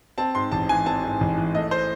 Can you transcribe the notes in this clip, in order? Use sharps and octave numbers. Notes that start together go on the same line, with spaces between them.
C4 A5
G#2 C6
A1 A5
E3 G#5
C4 A5
G#2
A1
E3
A3 D#5
C5